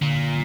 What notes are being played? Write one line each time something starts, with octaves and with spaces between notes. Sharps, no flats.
A#2 D3